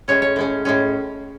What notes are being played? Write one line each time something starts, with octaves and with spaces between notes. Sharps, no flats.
A2 G#3 C#4 C#5
C#5
A2 G#3 C#4
A2 G#3 C#4